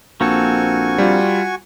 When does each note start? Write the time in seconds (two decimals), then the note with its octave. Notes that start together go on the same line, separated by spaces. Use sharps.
0.21 A#1 A#3 C4 F#4 A4 G#5 C#6
0.98 G3 F4